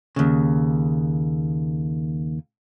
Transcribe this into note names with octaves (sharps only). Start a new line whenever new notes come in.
D#2 C#3